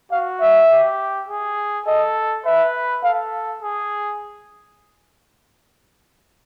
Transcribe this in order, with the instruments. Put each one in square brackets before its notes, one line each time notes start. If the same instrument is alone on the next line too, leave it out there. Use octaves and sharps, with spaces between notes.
[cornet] F#4 [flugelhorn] F5
[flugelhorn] E5
[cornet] G4
G#4
[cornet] A4 [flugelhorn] D#5
[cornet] B4 [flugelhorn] E5
[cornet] A4 [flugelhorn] F5
[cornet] G#4